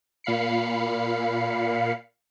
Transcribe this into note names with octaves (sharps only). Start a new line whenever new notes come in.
A#2 F5 B5 C7 C#7